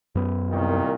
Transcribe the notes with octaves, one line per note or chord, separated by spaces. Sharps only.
F#2 B3
C2 A#2 D#3